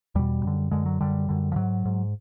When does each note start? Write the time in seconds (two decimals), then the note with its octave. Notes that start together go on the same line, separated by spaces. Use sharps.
0.15 E2 B2 G3
0.43 F#2 D3
0.71 F#2 D3 G#3
0.86 F#3
1.00 F#2 D3 G3
1.29 F#2 D3
1.52 F3
1.56 G#2 F#3
1.85 G#2